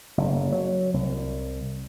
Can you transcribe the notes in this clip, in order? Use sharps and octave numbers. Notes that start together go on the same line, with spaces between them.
F#1
F#3
C2